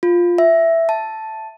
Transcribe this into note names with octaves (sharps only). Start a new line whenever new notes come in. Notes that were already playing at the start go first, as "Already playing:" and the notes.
F4
E5
A5